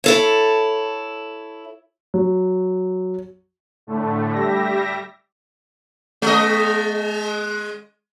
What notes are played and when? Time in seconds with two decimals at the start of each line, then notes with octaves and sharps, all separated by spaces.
0.04 E4 A4 C#5
2.14 F#3
3.87 A2 D3 A3
4.33 G3 G4 E5 A#6
6.22 G#3 D#5